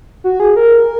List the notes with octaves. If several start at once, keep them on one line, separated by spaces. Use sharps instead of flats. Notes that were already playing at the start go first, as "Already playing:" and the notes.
F#4
G#4
A#4